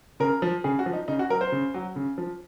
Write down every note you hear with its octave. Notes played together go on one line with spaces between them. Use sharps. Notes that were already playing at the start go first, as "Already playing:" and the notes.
C#3 A#4
F3
C#3 G#4
F#4
F3
D#4
C#3 D#4
F#4
F#3 A#4
C5
C#3
F#3
C#3
F3